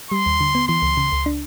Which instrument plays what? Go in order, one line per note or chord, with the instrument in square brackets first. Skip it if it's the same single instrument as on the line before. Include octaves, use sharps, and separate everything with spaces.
[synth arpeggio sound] G3 [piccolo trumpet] C6
[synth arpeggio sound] D#2
D3
B3
[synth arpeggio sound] E3 [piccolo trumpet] C6
[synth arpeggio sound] C#2
C#3
C#2
D4